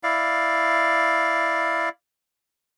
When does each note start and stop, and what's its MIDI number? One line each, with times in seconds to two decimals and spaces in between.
0.03 1.89 64
0.03 1.89 74
0.03 1.89 77